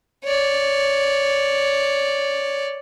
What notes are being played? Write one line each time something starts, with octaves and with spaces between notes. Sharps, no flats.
C#5 D5